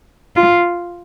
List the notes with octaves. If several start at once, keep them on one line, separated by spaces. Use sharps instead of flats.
F4